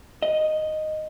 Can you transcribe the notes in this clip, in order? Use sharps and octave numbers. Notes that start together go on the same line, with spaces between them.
D#5